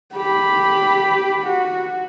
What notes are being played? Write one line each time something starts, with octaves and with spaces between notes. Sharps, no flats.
G4 B5
F#4